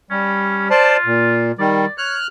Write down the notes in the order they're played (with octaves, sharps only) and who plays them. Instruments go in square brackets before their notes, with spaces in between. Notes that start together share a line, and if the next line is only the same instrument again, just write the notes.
[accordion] G3 [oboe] C#4
[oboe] F4 [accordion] C5 D5 A5
[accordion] A#2
[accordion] D#3 G3 [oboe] D5
[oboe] C#5 [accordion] F6 F#6